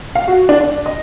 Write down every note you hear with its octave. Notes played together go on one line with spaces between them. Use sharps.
F5
F#4
D4
D4
D#5